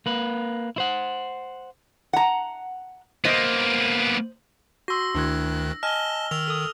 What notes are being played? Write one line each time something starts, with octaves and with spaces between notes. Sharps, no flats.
A#3 B4
E4 C5 F#5
F#5 A#5
A#3 B3 C5 D#5
F#4 C6 E6 A#6
D2 D#3 D4 E4 F#6 G#6
D#5 G#5 A5 F6 G7
D#3 E6 F7
A4 D#6